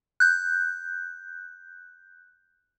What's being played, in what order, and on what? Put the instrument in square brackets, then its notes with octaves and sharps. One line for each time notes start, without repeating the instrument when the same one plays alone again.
[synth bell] F#6 G6